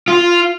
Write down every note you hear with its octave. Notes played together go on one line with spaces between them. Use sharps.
F4